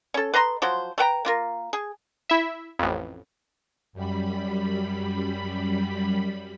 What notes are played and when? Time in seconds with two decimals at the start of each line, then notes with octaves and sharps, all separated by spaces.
0.14 C#4 A4
0.34 B4 D#5 A#5 C6
0.62 F3 F#3 C5
0.98 A3 B4 G5 A#5
1.25 A#3 F4 A#4
1.73 G#4
2.30 E4 E5
2.79 A1 F2
3.93 F#2 G3 B5